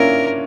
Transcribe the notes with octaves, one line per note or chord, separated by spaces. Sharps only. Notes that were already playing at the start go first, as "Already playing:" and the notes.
Already playing: A#3 C#4 D4 E4 F4 A#4